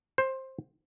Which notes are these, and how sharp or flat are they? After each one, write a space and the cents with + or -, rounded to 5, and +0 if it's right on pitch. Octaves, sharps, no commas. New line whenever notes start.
C5 +15